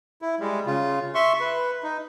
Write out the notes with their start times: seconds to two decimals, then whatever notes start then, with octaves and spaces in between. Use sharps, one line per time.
0.22 E4
0.40 G3 G#3
0.66 C#3 F4
1.15 E5 C6 C#6
1.40 B4
1.83 D#4